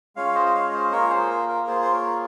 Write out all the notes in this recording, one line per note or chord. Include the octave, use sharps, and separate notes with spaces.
G#3 C#4 F4 C#5 F5
C5 D#5
D#5
C#5 F5
C5 D#5
A#3 F4 G#4 A#4 C#5
G#4 C5
A#4
A#4
A#3 F4 G#4 C5
C5
A#4 C#5